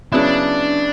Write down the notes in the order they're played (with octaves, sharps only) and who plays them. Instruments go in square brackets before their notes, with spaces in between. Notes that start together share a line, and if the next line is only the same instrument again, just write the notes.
[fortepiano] C#3 F#3 B3 E4 [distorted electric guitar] D4